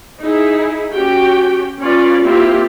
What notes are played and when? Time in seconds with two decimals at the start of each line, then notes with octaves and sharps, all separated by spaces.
0.21 D#4 E4 G#4
0.92 C#4 F#4 G4 G5
1.81 C#4 F4 B4 D5
2.24 A#3 C4 E4 F4 G4